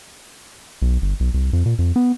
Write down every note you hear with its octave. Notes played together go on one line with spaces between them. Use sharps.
B1
G1
B1
C2
F2
A#2
F2
B3